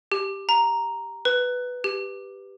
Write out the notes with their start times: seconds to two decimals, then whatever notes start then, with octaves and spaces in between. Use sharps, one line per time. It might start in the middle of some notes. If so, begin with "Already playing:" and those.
0.12 G4
0.49 A#5
1.25 B4
1.84 G4